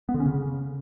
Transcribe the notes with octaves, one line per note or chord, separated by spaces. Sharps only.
B3
D3
C#4
C#3